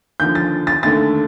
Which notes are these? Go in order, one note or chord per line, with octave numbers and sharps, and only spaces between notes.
D#2 D3 F3 G6
A6
A6
D#2 D3 A3 A6